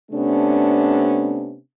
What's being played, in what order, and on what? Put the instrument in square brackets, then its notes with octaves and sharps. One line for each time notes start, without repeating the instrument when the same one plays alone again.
[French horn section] C3 A3 B3 C#4 D4